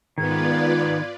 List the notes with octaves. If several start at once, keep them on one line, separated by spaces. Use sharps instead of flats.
G#2 D#3 B3 F4 B4 D5 G#6